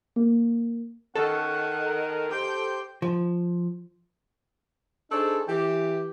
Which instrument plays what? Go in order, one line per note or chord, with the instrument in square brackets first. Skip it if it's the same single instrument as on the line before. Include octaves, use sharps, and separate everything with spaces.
[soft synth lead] A#3
[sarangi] D#3 [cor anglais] C#4 [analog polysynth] A4 [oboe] F#5
[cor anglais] A#4
[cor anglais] G4 [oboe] C5 [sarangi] G5
[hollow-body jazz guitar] F3
[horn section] D4 D#4 G#4 A4 C5 C#5
E3 G4